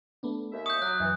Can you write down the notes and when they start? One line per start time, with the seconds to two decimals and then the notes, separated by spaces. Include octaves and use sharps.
0.23 A3 B3 D4
0.52 D#2 E5
0.66 C#6 D#6 G6
0.82 F#3 D6 F#6
1.00 F#2 E3